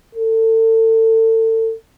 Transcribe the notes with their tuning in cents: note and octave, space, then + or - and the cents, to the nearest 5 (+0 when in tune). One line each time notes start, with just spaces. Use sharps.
A4 +35